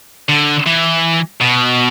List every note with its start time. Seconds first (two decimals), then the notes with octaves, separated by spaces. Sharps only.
0.29 D3
0.66 E3
1.41 B2